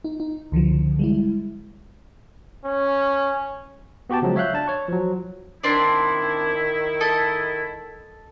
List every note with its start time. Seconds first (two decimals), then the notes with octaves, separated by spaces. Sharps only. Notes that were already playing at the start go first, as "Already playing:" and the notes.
0.05 D#4
0.20 D#4
0.52 C#2 D3 E3 F3
0.99 G3 G#3 E4
2.65 C#4
4.10 B3 F#4 G4 G5 A5
4.22 C#3 F3 F#3 G#3
4.36 C#5 E5 F5 F#6 G6
4.54 D4 A5
4.68 C#5 C#6
4.88 F3 F#3
5.64 D#3 C4 D4 E4 D5
7.01 A4 D#5